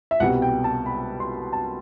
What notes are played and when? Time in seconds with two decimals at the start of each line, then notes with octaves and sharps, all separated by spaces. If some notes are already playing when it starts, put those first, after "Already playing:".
0.11 E5
0.20 C2 B2 G3 F#5
0.42 G5
0.64 A5
0.86 B5
1.20 C6
1.53 A5